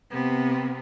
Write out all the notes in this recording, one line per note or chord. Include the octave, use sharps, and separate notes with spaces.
C3 B3